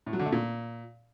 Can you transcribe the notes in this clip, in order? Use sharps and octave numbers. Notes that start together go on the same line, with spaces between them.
A2
F#3
D3
A3
A#2